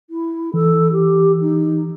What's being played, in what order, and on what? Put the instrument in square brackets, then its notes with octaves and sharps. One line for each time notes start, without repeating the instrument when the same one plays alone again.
[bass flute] E4
[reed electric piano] E3 [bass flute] A4
[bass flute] G4
D#4